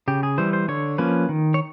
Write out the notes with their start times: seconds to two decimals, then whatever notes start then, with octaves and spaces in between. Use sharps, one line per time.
0.08 C#3 G4
0.23 G#4
0.38 E3 G3 C5
0.53 C5
0.68 D3 C#5
0.98 F3 A#3 C#4 B4
1.29 D#3
1.54 C#5